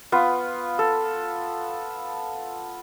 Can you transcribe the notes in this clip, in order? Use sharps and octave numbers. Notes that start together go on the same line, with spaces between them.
B3 F4
A4